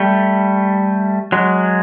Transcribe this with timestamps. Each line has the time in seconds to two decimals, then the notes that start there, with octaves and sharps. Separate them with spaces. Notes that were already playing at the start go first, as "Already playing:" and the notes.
Already playing: G3 A3
1.32 F#3 G#3